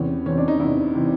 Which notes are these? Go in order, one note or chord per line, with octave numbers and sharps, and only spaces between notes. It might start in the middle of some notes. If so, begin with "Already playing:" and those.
Already playing: E2 C3 E3 C#4
E2 C3 E3 C#4
D4
D#4
E2 C3 E3 E4
C3 E3